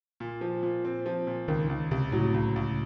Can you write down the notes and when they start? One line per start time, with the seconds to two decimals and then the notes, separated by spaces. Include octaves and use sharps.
0.20 A#2
0.41 F3
0.63 A#2
0.85 C4
1.06 F3
1.27 A#2
1.48 C#2 D#3
1.70 C#2
1.91 C#2 C3
2.12 A2 F#3
2.34 C#2
2.56 C#2